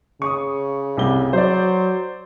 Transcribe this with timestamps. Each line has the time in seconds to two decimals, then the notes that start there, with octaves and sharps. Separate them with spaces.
0.22 C#3 C#6 D#6
0.97 C2 C3 G7
1.33 F#3 C5 D5